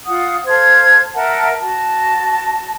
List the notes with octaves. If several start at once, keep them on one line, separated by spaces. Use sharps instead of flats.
F4 F#5 D#6
A4 C5 F5 G#6
A#4 E5 F#5 A5
F#4 A5